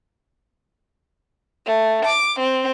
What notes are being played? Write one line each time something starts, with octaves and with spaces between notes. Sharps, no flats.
A3
D6
C4